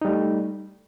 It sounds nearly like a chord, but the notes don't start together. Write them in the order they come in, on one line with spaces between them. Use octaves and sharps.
D#4 G3 A3